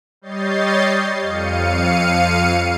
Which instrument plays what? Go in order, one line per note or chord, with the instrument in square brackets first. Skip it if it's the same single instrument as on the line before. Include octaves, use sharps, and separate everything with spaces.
[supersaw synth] G3 C#5 D#5 G6 A6 C7
F2 F5 C#7 D#7